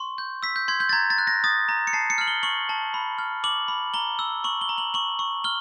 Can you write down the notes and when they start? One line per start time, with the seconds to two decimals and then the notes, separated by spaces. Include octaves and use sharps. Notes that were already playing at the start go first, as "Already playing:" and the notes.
Already playing: C6 C#6
0.18 G6
0.43 E6 B6
0.56 G6
0.68 C6 G#6
0.80 G6
0.89 A6
0.93 A#5 G#6
1.10 A6
1.18 F#6
1.27 A#6
1.44 D#6 A6
1.69 A#5
1.87 C#7
1.93 A5 C7
2.10 C#7
2.18 F6 F#7
2.28 G7
2.43 C#6 F#7
2.69 A5
2.94 B5
3.18 F6
3.44 D6 F#7
3.68 B5
3.94 A#5 G7
4.19 E6
4.44 C#6 F#7
4.61 G7
4.69 A#5
4.78 F#7
4.94 C#6 F#7
5.19 C#6
5.44 F6 G7